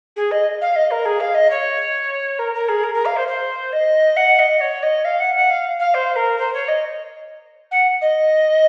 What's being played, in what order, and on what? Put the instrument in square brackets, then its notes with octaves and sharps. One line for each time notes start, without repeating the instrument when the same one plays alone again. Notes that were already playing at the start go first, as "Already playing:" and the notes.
[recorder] G#4
D#5
F5
D#5
A#4
G#4
F5
D#5
C#5
A#4
A#4
G#4
A#4
A#4
F5
C5
C5
D#5
F#5
D#5
C#5
D#5
F5
F#5
F#5
F5
F5
C5
A#4
C5
C#5
D#5
F#5
D#5